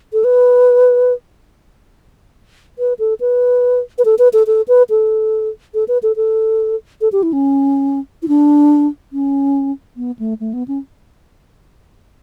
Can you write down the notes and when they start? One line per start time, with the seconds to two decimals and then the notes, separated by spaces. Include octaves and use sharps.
0.13 A4
0.24 B4
2.79 B4
2.99 A4
3.20 B4
3.98 B4
4.05 A4
4.19 B4
4.33 A4
4.47 A4
4.68 B4
4.90 A4
5.74 A4
5.88 B4
6.03 A4
6.16 A4
7.01 A4
7.12 G4
7.23 E4
7.33 C#4
8.23 E4
8.28 D4
9.12 C#4
9.97 B3
10.19 A3
10.40 A3
10.53 B3
10.68 C#4